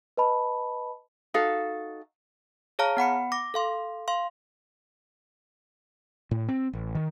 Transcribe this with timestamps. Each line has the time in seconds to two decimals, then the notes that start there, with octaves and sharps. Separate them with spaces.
0.17 B4 D#5 A5 B5
1.34 D#4 F#4 A4 F5
2.79 G#4 C#5 F5 A5 A#5 F6
2.97 B3 F#5 B5 C#7
3.32 D6 A#6
3.54 A4 F5 C6
4.08 F5 C6
6.31 A2
6.48 C4
6.73 A1
6.95 D#3